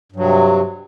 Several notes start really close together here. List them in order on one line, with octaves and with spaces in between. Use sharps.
G2 F#3 C3